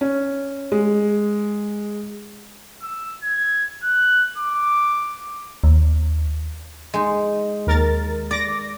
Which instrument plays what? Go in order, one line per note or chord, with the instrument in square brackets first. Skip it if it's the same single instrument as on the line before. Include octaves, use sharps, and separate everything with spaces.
[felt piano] C#4
G#3
[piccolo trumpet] E6
G#6
F#6
D6
[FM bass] D#2
[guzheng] G#3 D#4
[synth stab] D#2 A#4 A6
[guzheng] D5 [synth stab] D6 A#6